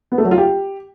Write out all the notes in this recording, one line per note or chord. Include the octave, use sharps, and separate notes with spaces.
B3
A3
F#3
F4
G4